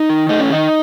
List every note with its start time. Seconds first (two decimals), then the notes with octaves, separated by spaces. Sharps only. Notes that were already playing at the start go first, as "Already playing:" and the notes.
Already playing: D#4
0.09 D#3
0.29 A3 D#4
0.40 C#4
0.49 D#3 D#4